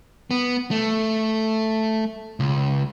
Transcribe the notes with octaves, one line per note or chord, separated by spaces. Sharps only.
B3
A3
C#2